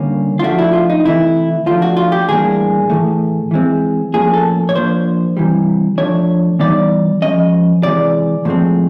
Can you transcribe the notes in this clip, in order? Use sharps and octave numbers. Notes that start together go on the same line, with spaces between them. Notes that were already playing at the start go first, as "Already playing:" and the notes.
Already playing: D3 G3 A#3 C#4
F4
F3 A3 D4 F#4
E4
F4
D#4
C3 E3 A3 E4
F3 A3 D4 F4
F#4
F4
G4
A2 E3 G3 A#3 D4 G#4
A2 E3 A3
E3 G#3 C4
A2 F3 A#3 C#4 G#4
A4
C#5
F3 A#3 D4 C5
C3 E3 G3
F3 A3 D4 C#5
E3 G3 B3 D#4 D5
F3 G#3 C#4 D#5
C3 E3 G#3 D5
A2 F3 G#3 C4